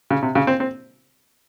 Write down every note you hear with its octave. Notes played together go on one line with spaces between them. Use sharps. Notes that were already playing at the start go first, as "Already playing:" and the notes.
C#3
C3
C#3
C4
C4